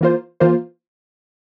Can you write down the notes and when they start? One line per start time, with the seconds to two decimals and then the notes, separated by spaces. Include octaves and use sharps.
0.01 E3 A#3 F4 C5
0.40 E3 A#3 F4 C5